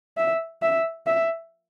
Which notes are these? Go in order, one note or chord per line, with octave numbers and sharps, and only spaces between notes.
E5
E5
E5